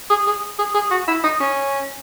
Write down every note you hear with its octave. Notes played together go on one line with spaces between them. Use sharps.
G#4
G#4
G#4
G#4
F#4
E4
D#4
C#4